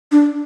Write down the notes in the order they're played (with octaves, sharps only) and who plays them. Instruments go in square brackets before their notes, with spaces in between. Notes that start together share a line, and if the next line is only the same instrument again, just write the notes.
[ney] D4